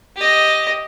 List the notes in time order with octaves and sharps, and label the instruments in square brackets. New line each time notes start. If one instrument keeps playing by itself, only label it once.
[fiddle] G4 D#5